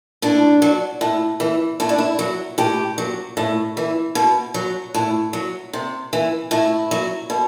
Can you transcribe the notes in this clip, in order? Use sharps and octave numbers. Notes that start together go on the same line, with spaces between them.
A2 D4
F#3
A2
E3
A2 E4
D4
E4
F#3
A2 G4
F#3
A2
E3
B2
F#3
A2
F#3
C3
E3
A2 E4
F#3
B2